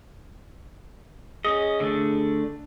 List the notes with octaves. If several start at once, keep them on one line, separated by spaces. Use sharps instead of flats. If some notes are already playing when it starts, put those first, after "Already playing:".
C#4 G#4 D#5
D3 A3 D4